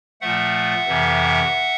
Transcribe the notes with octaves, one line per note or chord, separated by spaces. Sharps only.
A#2 F3 A3 E5 F#5
F2 C3 E3